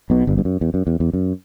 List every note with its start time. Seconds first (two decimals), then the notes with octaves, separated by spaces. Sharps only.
0.10 B1 B2
0.27 G1 G2
0.38 G2
0.45 F#2
0.61 E2
0.74 F#2
0.87 E2
1.00 E2
1.13 F#2